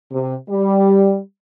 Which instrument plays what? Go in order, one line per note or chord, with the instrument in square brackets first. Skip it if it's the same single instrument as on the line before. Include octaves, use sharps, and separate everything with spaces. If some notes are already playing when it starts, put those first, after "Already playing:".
[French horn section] C3
G3